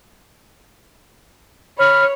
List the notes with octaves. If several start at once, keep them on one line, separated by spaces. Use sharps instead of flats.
C#5 B5 F6